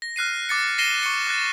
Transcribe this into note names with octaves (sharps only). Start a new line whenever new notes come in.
A#6
F6 F#6 C7 D#7
D6 A6 C#7
A#6 C7 D#7 E7 G7
C#6 C#7
D6 F#6 A6